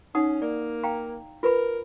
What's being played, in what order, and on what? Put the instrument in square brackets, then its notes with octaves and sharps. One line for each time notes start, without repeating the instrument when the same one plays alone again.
[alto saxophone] C#4 [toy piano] D#4 F#5 D#6
[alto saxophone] A#3 [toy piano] D5
[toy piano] F5 G5 A#5
[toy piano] F4 B4 B5 [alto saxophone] A#4